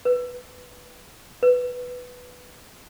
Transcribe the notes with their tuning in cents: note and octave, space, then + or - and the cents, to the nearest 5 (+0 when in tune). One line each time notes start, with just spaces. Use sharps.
B4 +0
B4 +5